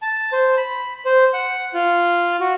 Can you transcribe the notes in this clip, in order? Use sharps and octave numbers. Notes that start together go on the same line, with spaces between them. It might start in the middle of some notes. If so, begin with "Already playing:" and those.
A5
C5
B5
C5
F#5
F4
F#4